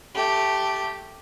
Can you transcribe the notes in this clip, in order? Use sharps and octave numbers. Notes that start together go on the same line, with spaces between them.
A3 G4